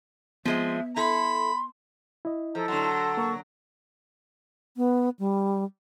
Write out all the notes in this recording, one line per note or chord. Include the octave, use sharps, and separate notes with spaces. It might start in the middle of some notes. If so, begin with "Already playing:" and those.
F3 G#3 B3 C4 E5
E4 A4 B5 C6
E4 D#5
F3 A4 A#5
D3 F#3 C6
A#3 A#4 C#6
B3
G3